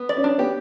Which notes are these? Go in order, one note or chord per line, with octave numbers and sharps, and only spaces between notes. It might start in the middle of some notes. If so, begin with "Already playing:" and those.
Already playing: B3
D5
C#4
D4
B3 G4